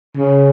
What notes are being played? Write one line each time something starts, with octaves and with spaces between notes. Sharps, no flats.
C#3